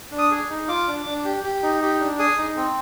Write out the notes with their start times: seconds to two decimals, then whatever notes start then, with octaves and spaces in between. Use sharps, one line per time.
0.12 D4
0.18 D#6
0.31 G#4
0.50 D#4
0.68 F4 D6
0.87 D4
1.06 D4
1.25 G4
1.44 G4
1.63 D#4
1.82 G4
2.00 D4
2.19 G#4 D#6
2.38 D#4
2.56 C4